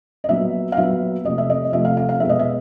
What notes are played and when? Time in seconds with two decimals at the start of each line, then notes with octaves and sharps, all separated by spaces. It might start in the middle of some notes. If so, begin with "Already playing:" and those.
0.24 D#5
0.29 A#2 F#3 B3 E5
0.72 F5
0.77 A#2 F#3 B3 E5
1.24 C3 F3 A3 D#5
1.38 E5
1.50 D#5
1.72 C3 F3 A3 E5
1.85 F5
1.97 F5
2.09 F5
2.20 B2 G#3 B3 E5
2.29 D#5
2.39 E5